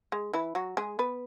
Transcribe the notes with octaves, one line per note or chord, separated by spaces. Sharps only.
G#3
E3 E4
F#3 F#4
G#3 G#4
B3 B4